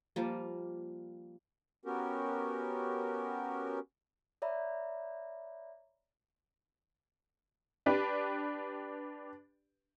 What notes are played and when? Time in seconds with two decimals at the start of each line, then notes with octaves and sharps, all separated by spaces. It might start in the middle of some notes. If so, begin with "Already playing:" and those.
0.16 F3 G3 A#3
1.85 B3 C#4 F#4 G4 A#4
4.42 C#5 D5 E5 A#5 B5
7.86 D4 G4 B4